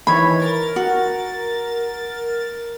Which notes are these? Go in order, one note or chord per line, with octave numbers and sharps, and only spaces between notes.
D#3 E3 C#5 B5
A#4 A6
F#4